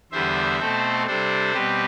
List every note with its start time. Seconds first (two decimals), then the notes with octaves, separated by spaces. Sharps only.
0.12 E2 D3 G3 B3 C5 E5
0.59 B2 A3 C4 A4 C5
1.07 C3 G3 D4 A4 C5
1.54 B2 G3 C4 G4 B4